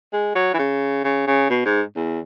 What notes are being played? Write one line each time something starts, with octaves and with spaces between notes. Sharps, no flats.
G#3
F#3
E3
C#3
C#3
C#3
B2
G#2
E2